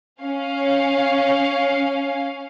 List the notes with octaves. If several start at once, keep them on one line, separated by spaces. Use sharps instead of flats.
C#4 F5